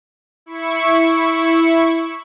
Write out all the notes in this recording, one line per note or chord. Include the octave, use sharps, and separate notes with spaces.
E4 C#6